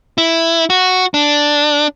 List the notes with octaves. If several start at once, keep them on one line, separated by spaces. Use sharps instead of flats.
E4
F#4
D4